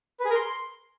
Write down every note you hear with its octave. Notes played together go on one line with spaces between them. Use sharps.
B4
G#4
A#4
C6